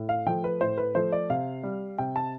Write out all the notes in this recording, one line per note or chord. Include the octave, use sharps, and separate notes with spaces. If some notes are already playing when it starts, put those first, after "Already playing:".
Already playing: A2
F5
F3 A3 G5
B4
A2 C5
B4
F3 A3 C5
D5
C3 F5
G3
C3 G5
A5